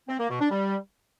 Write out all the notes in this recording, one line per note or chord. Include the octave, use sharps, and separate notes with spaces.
C4
A#3
B2
D4
G3